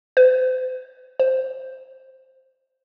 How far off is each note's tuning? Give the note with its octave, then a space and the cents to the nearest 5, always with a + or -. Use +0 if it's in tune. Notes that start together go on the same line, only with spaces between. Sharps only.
C5 -40
C5 +5